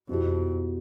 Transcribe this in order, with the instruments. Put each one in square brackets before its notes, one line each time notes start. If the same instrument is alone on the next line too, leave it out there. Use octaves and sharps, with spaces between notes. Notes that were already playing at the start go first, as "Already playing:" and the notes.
[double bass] F2 [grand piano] B2 B3 E4 G4